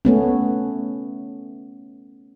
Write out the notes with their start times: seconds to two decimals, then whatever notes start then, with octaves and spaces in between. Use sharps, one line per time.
0.05 A3 B3 C#4